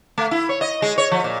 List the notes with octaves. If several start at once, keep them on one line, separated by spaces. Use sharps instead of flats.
A3
E4
C#5
D#5
G#3
C#5
F3
A#2